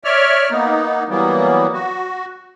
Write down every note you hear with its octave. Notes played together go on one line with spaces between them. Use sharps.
C#5 D5 E5 F6
A#3 B3 D#4
E3 F#3 G3 A#3 B3
F#4